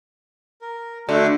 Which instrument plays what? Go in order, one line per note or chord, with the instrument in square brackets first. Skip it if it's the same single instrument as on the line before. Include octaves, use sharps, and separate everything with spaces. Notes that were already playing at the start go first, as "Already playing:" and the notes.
[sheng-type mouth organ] A#4
[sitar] D3 [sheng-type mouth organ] A3 F#4